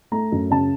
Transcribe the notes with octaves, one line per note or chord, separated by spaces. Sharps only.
A3 A#5
F#2
C#3 A5